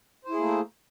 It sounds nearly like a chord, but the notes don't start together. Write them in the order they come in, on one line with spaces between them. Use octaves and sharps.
C5 E4 G#4 A#3 A3